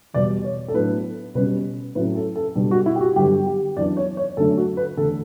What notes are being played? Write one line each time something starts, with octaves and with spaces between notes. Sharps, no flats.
E2 B2 G3 D5
C#5
A4
A2 F#3 B3 D4 B4
B2 G3 C#4 B4
A2 F#3 A3 C#4 B4
A4
A4
B2 G3 D4
F#4
E4
G4
F#4
G2 D3 F#3 B3 G4
G4
F#2 E3 B3 D4 D5
C#5
C#5
F#2 D3 A3 D4 A4
F#4
B4
E2 D3 A3 A4